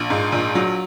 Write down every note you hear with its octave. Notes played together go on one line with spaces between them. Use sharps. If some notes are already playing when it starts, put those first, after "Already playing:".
Already playing: A#1
G#2
A#1
F#3